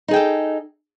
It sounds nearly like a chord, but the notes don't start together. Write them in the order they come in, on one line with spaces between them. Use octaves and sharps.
D#4 G#4 G5 A4